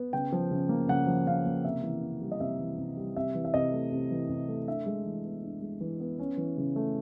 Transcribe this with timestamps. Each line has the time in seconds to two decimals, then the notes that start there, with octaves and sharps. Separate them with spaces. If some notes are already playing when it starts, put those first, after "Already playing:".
Already playing: B3
0.13 C#3 G5
0.32 F3
0.51 C#3
0.69 A#3
0.89 C#3 F#5
1.07 F3
1.27 C#3 F5
1.46 A#3
1.64 C3 E5
1.83 E3
2.02 C3
2.21 G3
2.32 D#5
2.40 C3 E5
2.59 E3
2.78 C3
2.97 G3
3.16 C3 E5
3.35 E3
3.45 E5
3.54 C3 D#5
3.72 A3
3.92 C3
4.11 E3
4.29 C3
4.49 A3
4.68 D4 E5
4.86 G#3
5.05 E3
5.25 B3
5.43 D4
5.62 G#3
5.81 E3
6.00 B3
6.19 C#4
6.37 E3
6.58 C#3
6.76 A3